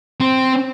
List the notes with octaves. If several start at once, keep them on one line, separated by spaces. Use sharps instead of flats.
C4